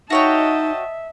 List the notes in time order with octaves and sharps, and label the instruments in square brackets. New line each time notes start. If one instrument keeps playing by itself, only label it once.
[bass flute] D#4 [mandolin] F#4 C#5 G5 [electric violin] D#5 A5 [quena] E5